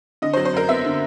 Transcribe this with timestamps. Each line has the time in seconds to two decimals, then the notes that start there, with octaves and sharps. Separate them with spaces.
0.22 D3 D#5
0.33 C5
0.37 F#3
0.45 C5
0.53 F#2 A#4
0.69 B3 E5
0.85 D3